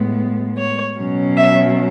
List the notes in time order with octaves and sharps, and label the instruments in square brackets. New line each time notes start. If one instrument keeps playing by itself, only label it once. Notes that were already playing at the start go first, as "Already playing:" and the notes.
Already playing: [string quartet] A2 G#3 B3
C#5
B2 F#3 C#4
E5